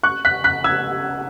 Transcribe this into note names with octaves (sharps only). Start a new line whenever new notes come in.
C#6 F#6
F#6 B6
F#6 B6
E6 G#6